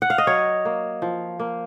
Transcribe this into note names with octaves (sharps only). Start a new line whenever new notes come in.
F#5
F5
D#5
F#3 C#5
A#3
F3
A#3